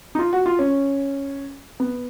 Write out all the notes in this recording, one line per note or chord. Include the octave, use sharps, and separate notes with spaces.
D#4
F4
F#4
F4
C#4
B3